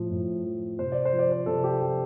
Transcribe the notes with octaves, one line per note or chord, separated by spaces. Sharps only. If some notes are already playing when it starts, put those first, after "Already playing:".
Already playing: A2 F3
A2
F3
C3 C5
D5
C5
F3
D5
C5
C3 A4
G4
F3 G4